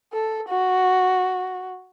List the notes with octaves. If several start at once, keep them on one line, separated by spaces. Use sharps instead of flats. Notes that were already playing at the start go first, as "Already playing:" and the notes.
A4
F#4